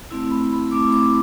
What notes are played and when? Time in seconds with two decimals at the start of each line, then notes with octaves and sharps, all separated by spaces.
0.10 A3 C4 E4
0.31 B5
0.52 B5
0.71 A3 C4 E4 D6
0.92 D6